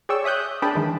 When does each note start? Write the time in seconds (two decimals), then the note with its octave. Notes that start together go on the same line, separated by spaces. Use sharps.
0.09 G#4 C#5 D5 G5 C#6 E6
0.24 C#5 E5 D#6 F#6 G6
0.62 D4 G#4 A#4 G5 A5 B5
0.75 D#3 E3 G#3